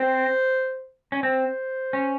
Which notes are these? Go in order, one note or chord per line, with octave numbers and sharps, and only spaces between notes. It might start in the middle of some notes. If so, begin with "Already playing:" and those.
Already playing: C4 C5
C#4
C4 C5
C#4